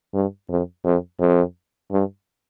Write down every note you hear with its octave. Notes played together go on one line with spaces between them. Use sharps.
G2
F2
F2
F2
G2